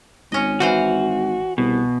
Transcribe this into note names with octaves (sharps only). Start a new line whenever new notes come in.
G#1 C#4 D#5
E3 F#4 C5 F5
C2 B2